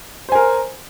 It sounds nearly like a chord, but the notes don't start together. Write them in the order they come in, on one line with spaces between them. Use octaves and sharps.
C5 G#5 A#4